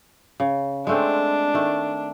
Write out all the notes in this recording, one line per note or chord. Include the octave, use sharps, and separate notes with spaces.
C#3
G#3 A3 C4 D4
D#3 A3